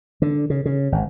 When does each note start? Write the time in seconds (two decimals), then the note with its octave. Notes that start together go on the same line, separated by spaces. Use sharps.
0.22 D3
0.50 C#3
0.65 C#3
0.92 G#1